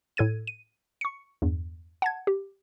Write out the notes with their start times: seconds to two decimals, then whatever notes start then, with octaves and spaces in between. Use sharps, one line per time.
0.17 A2 A4 G#6 D#7
0.47 D#7
1.01 C#6 C#7
1.42 E2 G2
2.02 F#5 A5 G#6
2.27 G4